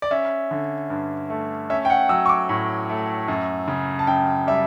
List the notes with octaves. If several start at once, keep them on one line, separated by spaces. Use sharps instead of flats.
D5
C#4 E5
D3
G2
A3
C#4 E5
G5
F#5
F#3 E6
C#6
D6
A2
A3
F#2
C#3
A5
F#2 G5
G3 E5